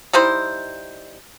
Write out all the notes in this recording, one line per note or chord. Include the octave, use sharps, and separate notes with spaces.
G3 D#4 E4 C5